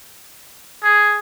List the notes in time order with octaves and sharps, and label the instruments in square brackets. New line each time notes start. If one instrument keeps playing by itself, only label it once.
[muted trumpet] G#4